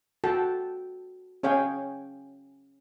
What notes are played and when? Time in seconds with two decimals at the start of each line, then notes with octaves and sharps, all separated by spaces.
0.24 F#4 A4 G5 A5
1.43 C#4 G#4 C#5 F5 G5 G#5